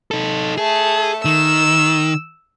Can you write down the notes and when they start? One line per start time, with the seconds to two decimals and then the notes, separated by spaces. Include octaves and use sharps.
0.11 D#4 A4
0.58 A3 G#4 A4
1.25 D#3 E6